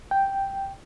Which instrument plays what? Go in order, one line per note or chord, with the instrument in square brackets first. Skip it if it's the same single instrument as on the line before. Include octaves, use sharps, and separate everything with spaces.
[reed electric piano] G5